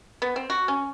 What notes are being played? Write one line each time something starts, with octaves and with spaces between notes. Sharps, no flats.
B3
C4
F#4
C#4